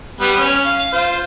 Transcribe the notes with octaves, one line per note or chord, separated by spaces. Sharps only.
G3 B3 B4
C#4
F5
F4 C5